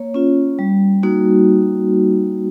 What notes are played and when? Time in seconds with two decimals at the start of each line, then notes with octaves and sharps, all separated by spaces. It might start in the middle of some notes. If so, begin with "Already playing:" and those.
Already playing: A#3 C#5
0.14 C#4 F4
0.59 G3
1.03 A#3 D#4 F#4